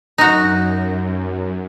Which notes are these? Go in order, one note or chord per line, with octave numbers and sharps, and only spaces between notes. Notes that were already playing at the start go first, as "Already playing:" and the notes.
F#2 D#4 F#4